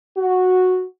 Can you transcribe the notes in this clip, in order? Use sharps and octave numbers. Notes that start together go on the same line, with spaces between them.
F#4